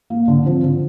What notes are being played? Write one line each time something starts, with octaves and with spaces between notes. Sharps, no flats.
A#3
D3
F3 C4
D3